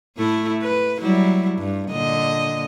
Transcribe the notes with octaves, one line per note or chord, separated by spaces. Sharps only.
A2 A3 E4
B4
F#3 G3 E4
G2
A#2 D3 D#5